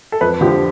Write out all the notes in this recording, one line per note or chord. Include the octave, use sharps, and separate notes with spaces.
A4
F2 B4
D3 F3 G4